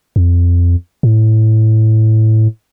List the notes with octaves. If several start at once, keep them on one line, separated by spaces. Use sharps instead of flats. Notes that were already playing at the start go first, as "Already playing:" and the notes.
F2
A2